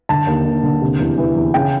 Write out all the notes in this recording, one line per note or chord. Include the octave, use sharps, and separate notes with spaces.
D3 A5
D#2
D#2
D3
C3
E2
E3
E2
C#3 G5